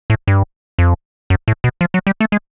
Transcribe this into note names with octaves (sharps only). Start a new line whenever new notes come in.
A2
G2
F2
F#2
A2
B2
F3
F#3
G3
A3
G#3